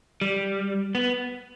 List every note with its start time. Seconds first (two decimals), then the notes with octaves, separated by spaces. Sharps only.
0.21 G3
0.95 B3